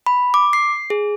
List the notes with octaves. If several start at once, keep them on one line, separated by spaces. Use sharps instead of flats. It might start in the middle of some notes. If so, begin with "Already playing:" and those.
B5
D6
C7
G#4